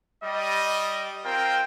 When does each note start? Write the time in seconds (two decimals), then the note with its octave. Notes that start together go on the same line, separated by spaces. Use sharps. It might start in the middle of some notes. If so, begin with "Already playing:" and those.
0.23 G3 D#5
1.24 C4 F4 A#4 G5